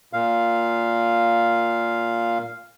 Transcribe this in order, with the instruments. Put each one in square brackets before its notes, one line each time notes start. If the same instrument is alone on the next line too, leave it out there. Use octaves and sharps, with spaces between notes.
[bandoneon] A#2 F5